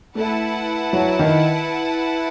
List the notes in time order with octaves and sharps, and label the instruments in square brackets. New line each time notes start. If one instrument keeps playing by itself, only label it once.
[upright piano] A3 [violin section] E4 B4 F#5 A5
[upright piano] F#3
D#3